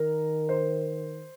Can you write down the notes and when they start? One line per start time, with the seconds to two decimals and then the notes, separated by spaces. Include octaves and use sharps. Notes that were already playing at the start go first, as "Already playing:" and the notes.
Already playing: D#3 A#4
0.49 C5